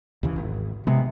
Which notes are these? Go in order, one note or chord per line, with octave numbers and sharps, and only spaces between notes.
D#2 C#3 E3
G#1
C3 G#3 B3